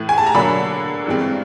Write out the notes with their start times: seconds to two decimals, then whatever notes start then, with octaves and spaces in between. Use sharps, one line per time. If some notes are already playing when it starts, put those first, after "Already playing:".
Already playing: A2 E3 A3
0.09 G#5
0.18 A5
0.26 A#5
0.35 D3 F#3 A#3 D4 B5
1.06 G2 E3 G#3 C4